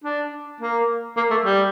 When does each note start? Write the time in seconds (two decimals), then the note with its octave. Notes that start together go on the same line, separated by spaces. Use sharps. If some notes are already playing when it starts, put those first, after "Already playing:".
0.04 D4
0.61 A#3
1.17 A#3
1.31 A3
1.45 G3